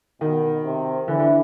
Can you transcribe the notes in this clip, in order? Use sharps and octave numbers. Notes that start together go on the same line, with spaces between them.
B2 D#3
C3
D3 E3
D3